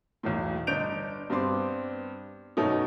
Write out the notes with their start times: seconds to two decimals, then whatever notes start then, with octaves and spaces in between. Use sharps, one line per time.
0.23 B1 E2 A2
0.67 G1 D4 D#5 G6 D7 F7
1.30 G2 B3 C4 D5 C6 D6
2.57 F#2 B2 A3 C#4 D#4